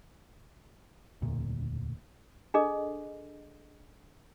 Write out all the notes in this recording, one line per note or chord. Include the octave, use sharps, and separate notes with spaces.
E1 D2 A#2
D4 G#4 A4 D#5